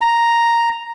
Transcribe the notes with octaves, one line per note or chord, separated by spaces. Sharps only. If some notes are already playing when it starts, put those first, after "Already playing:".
A#5